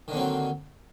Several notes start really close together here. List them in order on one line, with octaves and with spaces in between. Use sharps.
D#3 D3 A#3 C4 F#3